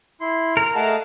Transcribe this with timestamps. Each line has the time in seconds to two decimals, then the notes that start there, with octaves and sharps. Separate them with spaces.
0.21 E4 C6
0.57 A#4
0.75 A3 G#4 D#5 F5 F#5 A5